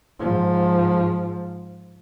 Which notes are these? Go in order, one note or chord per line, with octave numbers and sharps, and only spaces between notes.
G#2 F3